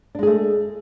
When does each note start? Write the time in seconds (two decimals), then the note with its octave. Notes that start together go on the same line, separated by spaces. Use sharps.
0.15 D4
0.19 G#3
0.23 G#4
0.27 A3